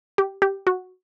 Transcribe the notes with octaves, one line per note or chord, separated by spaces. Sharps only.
G4
G4
F#4